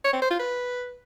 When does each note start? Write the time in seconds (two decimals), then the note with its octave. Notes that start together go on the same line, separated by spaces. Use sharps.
0.04 C#5
0.13 C4
0.22 C5
0.30 F4
0.39 B4